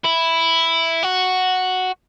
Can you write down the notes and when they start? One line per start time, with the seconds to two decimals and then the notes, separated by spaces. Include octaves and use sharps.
0.04 E4
1.03 F#4